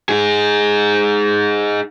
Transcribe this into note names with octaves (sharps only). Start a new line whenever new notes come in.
D#4 G#4